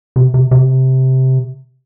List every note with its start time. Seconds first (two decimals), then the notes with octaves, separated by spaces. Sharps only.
0.16 C3
0.34 C3
0.51 C3